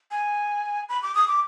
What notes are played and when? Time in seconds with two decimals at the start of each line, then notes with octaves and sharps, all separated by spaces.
0.11 G#5
0.89 B5
1.03 D6
1.15 D#6
1.28 D6